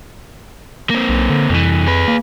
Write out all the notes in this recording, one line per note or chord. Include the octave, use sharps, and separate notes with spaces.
A#3 C4
B1
D3
C2 F2 E3
G#4 B4
A#3